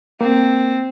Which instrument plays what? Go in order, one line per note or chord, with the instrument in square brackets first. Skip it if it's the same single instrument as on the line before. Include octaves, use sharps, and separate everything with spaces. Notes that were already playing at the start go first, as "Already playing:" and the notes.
[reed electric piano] A#3 [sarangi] C4